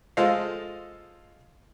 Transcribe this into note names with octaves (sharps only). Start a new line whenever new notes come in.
G#3 F4 A4 C5 D#5 F5